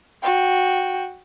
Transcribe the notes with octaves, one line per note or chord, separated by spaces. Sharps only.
F#4 G5